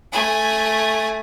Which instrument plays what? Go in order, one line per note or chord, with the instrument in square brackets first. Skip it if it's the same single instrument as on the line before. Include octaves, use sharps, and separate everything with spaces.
[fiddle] A3 G#5